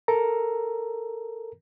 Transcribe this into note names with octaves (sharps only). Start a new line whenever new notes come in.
A4 A#4 A#5